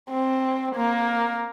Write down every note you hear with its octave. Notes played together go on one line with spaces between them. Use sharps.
C4
A#3